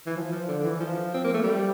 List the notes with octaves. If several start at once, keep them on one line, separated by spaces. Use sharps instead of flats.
E3
F3
F3
D3
E3
F3
C4
A#3
A3
G3